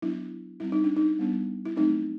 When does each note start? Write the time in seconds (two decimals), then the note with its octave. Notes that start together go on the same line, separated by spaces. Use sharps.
0.02 F#3 B3 D4 E4
0.60 G3 C4 E4
0.72 D#4
0.84 D4
0.96 D#4
1.19 G3 B3 D4
1.65 E4
1.76 F#3 A3 C4 D#4